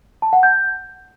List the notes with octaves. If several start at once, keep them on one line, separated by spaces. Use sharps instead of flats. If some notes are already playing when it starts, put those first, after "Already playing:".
A5
F#5
G6